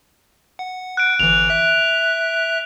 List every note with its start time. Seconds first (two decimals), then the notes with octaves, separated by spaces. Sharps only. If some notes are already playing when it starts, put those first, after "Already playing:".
0.59 F#5
0.97 F#6 D7
1.20 G1 E3 F7
1.50 E5 F#6